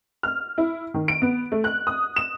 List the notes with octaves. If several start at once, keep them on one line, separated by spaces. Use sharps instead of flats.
F6
E4
D#3
D7
B3
A3
F#6
D#6
E7